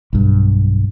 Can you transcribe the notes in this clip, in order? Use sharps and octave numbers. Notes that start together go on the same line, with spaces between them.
B1 G2